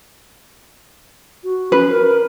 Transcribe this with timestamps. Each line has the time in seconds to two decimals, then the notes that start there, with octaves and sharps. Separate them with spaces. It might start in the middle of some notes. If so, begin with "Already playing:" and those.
1.44 F#4
1.72 C#4 B4
1.89 A#4